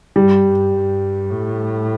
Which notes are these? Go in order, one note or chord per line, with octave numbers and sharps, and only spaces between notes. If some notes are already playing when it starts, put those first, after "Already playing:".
G2 G3
G2
G2
A2